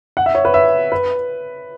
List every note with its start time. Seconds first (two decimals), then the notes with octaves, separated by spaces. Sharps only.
0.17 F#5
0.26 E5
0.35 C#5
0.45 B4
0.54 E5
0.92 B4